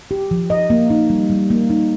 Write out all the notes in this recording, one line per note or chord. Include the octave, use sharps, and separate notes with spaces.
G4
F3
D#5
A#3
D#4
G3
G3
A#3
D#4